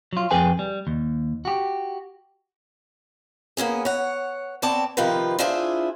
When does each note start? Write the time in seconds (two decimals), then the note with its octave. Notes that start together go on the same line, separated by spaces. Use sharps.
0.13 F#3 F4
0.31 F2 G#4 B4 G5 G#5
0.59 G3
0.87 D#2
1.45 F#4 G4
3.57 A#3 B3 C#4 G#4
3.85 C#5 F#5
4.62 B3 C4 C#5 D5 G5 A5
4.97 C3 D#3 F3 F4 B4
5.39 D4 E4 F4 G#4 C5 E5